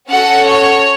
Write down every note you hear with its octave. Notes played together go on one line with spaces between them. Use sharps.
C#4 F#4 A4 F#5
C#5